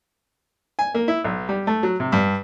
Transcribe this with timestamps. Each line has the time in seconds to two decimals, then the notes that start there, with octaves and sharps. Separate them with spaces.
0.79 G#5
0.95 A#3
1.08 E4
1.24 B1
1.49 G3
1.67 A3
1.83 F#3
2.00 C3
2.12 G2